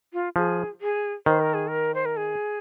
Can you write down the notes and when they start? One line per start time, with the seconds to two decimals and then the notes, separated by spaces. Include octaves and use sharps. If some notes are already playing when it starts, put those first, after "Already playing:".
0.13 F4
0.36 F3 G#4
0.81 G#4
1.26 D#3 C5
1.40 A#4
1.54 G#4
1.68 A#4
1.95 C5
2.05 A#4
2.17 G#4